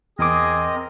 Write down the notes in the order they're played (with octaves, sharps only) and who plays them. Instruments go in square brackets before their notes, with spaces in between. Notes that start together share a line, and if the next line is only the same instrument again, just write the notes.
[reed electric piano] E2 D6 [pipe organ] C4 A#4 D#5 [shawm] G#4